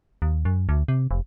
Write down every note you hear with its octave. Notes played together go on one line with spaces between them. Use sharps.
D#2
F#2
D2
C3
F1